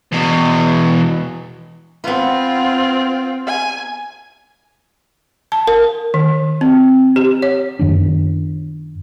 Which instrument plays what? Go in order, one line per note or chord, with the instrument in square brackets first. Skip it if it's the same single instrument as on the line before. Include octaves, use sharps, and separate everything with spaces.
[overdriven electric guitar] E2 B2
[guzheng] B3 B4 [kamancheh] C4 F4
[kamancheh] G#5
[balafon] A5
A#4
D#3
C4
G4
C#5
[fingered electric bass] F#2 D#3 A#3 D4